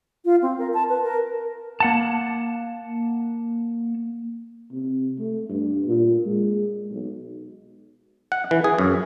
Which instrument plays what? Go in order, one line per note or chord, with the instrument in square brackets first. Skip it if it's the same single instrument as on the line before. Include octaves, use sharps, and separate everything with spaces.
[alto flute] F4
C4
A#4
A5
B4
A#4
[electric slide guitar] A#3 F#5 A5
[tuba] C3
A3
G2
A#2
G#3
B1
[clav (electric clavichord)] F#5
E3
G#4
F#2